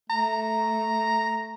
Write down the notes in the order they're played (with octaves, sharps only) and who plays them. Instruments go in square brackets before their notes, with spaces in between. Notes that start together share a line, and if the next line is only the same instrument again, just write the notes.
[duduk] A3 [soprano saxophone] A#5